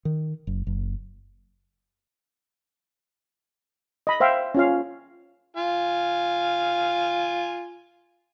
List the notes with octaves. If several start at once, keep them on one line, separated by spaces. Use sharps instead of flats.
D#3
F#1
F#1
D#5 B5
C5 E5 F5 G5
C#4 F4 F5
F4 F5 G#5